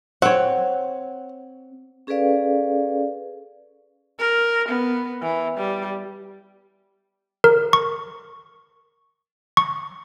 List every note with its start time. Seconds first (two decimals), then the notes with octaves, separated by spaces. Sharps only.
0.22 C4 C#5 F#5
2.07 C#4 G#4 A4 B4 D5 F5
4.19 A#4
4.68 B3
5.22 E3
5.57 G3
7.44 A#4
7.73 C#6
9.57 C#6